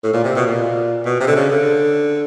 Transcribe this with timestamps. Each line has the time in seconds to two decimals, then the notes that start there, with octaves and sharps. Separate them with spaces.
0.03 A2
0.13 A#2
0.24 C3
0.36 B2
0.47 A#2
1.05 B2
1.20 C3
1.27 D3
1.35 C#3
1.50 D3